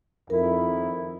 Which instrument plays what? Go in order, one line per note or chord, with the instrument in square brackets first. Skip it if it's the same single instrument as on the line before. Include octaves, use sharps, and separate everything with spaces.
[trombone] F2 [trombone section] D#3 E4 [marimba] A#4